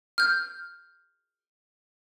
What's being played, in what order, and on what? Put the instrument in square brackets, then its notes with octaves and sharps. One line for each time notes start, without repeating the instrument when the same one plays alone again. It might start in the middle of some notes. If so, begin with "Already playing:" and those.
[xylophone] F6 G6